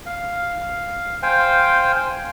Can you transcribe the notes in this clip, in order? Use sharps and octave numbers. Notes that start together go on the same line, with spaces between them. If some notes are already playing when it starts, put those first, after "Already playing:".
F5
C5 F5 G5 G#5